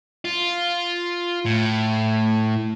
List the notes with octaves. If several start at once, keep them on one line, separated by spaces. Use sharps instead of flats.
F4
A2